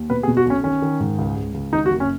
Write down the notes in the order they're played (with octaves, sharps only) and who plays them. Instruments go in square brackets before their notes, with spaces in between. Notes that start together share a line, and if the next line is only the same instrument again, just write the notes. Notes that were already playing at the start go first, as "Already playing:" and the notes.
Already playing: [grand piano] D#2
B2 B4
G#4
B2
F#4
B1 C#4
D#3 C#4
D#3
G#2
C#2
C#2
C#2
D#3 D#4
F#4
F#1
C#4